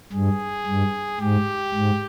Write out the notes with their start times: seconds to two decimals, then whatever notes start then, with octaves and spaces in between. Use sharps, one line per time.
0.13 G2 G#4
0.67 G2
1.20 G#2 G4
1.74 G#2